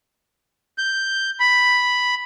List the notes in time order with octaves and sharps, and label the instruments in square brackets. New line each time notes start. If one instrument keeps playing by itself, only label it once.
[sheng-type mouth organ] G6
B5